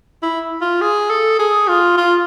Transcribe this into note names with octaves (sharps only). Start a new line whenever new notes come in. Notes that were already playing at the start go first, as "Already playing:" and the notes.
E4
F4
G#4
A4
G#4
F4
F4